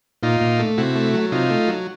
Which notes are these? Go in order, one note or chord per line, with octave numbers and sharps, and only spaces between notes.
A#2 D#4 F4
A#2
A3
C3 E4 F#4
A3
F#3
C3 D#4 F4
A3
F#3